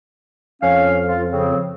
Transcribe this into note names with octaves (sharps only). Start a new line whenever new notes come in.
F2 C#4 F5
F4
C#3 C4